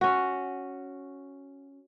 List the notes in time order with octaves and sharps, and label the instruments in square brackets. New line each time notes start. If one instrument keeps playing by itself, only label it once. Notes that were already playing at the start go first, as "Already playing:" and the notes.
[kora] C#4 F#4